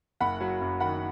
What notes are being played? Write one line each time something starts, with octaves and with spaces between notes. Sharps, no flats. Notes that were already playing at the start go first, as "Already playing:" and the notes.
F#1 F#5 B5
F#3
F#2
D#3 F#5 B5